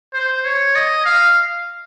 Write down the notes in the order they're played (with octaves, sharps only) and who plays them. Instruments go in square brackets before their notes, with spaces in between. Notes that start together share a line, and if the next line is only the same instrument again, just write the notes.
[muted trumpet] C5
C#5
D#5
F5